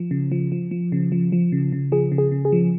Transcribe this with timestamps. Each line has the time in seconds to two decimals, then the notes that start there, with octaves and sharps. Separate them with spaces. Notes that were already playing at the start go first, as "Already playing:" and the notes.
Already playing: F3
0.11 C#3
0.32 F3
0.52 F3
0.71 F3
0.92 C#3
1.12 F3
1.32 F3
1.52 C#3
1.72 C#3
1.92 F3 G#4
2.12 C#3
2.18 G#4
2.32 C#3
2.45 G#4
2.52 F3